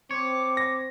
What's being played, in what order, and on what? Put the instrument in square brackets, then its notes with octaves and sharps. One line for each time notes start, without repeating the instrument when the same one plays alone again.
[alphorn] C4 [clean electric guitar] C#5 [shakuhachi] D6
[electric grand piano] A#6